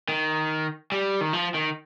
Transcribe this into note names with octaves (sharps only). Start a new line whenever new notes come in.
D#3
G3
D#3
F3
D#3